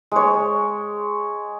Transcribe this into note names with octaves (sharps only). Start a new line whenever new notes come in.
G#3 C#5